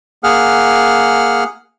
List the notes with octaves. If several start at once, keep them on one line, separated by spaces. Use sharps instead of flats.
A#3 G#4 F#5 F6